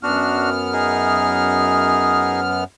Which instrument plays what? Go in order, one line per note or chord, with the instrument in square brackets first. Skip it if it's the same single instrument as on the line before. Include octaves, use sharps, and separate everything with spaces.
[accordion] F#2 B3 F6 [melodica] D4 F#4
[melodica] D#4 G#4